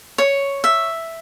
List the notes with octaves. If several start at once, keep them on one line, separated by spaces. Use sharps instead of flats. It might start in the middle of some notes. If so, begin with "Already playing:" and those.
C#5
E5